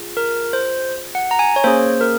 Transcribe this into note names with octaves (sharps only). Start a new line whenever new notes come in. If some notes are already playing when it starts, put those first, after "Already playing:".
Already playing: F4 G#4
A#4
C5
F#5
A#5
G#5
C#5
A#3 C#4 G#4 C5
A#4